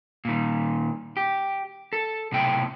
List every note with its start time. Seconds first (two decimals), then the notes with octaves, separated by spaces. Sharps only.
0.25 A#2 D#3
1.17 G4
1.93 A4
2.32 B1 A2 C3 G5